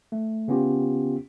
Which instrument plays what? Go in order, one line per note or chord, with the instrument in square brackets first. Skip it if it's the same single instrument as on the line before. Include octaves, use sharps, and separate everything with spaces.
[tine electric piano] A3
C#3 B3 C#4 F4 G4